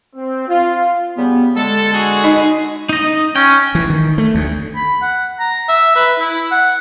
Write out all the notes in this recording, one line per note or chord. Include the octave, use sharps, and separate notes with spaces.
C4
F4
C#3 G3 B3
D3 G#3 A4
F#4 G#4
D#4 D#5
D#4 D#5
C#4 G5
E3
D#3
A3
D2
B5
F#5
A#5
E5
B4
E4
F#5